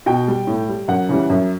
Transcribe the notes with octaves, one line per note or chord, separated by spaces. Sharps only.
B2 G5
G3
A2
G3
F#2 F#5
C#3 E3 G3
F#2 E5